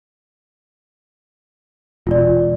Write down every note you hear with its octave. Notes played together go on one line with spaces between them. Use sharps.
E1 F4 D5